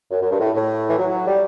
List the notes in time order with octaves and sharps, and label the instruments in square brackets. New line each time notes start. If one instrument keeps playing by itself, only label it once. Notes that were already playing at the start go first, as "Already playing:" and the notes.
[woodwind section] F#2
F#2
G2
A2
A2
E3
F#3
G3